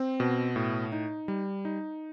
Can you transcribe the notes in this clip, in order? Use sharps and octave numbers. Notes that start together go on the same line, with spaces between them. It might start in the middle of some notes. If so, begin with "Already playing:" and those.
Already playing: C4
B2
A2
D#4
G3
D#4